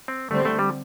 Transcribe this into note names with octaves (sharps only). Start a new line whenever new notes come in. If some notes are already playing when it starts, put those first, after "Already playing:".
C4
D3 G3 A3 C4
A3
G3